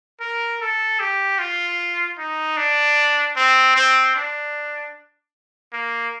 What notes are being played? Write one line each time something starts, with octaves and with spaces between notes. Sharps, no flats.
A#4
A4
G4
F4
D#4
D4
C4
C4
D4
A#3